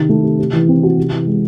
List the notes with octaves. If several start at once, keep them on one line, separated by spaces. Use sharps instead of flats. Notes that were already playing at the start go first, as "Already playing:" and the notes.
Already playing: C3 D#3
A3
C3
C3
E3
C4
F#4
C3
E3
G#3